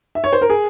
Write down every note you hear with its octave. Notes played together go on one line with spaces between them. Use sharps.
E5
C#5
C5
A#4
G#4